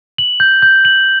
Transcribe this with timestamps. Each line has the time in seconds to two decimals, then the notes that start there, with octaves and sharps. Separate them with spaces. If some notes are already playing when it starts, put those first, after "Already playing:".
0.18 F#7
0.40 G6
0.62 G6
0.85 F#7